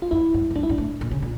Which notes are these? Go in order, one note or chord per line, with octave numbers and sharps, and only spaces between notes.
F4
F2 E4
G2
A2
G2 D4
E4
G2 D4
A2
A#2
C#3
A#2